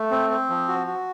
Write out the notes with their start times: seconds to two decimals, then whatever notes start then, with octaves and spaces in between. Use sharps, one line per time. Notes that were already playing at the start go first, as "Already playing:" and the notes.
Already playing: A3
0.11 C4
0.30 C4
0.50 F3
0.68 F#4
0.87 F#4